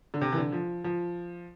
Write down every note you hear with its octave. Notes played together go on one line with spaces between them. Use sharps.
D3
C3
E3
D3
F3
F3